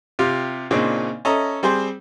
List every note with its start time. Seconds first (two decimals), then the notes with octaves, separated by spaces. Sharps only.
0.19 C3 F4 G4
0.71 A#2 C#3 C4 D4 D#4
1.25 C#4 A4 D#5 E5 A#5
1.63 G3 C4 G#4 C5